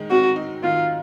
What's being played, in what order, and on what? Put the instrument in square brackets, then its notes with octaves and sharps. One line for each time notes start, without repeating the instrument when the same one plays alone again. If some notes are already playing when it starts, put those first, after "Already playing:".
Already playing: [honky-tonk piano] D#3 G#3 D#4
[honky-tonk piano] C4 [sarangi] F#4
[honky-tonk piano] D#4
[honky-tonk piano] D#3 [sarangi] F4